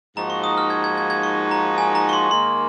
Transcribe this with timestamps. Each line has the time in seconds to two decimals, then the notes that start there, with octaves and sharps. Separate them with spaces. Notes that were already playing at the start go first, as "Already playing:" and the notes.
0.16 G#2 F3 A#3 D#4 F#4 A#5
0.30 C#6
0.44 D#6
0.58 F6
0.70 G#6
0.84 G#6
0.98 G#6
1.10 G#6
1.23 C#6
1.51 A#5
1.78 G#5
1.95 A#5
2.09 C#6
2.13 C6
2.30 G#2 D#3 A#3 C6